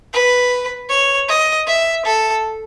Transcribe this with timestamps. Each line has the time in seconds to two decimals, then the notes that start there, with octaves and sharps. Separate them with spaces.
0.13 B4
0.89 C#5
1.28 D#5
1.67 E5
2.05 A4